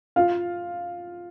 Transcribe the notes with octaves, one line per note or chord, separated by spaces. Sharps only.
F4 F5